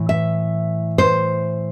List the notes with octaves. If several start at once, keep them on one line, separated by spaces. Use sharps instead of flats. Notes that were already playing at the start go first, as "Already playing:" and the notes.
Already playing: A2 E3
E5
C5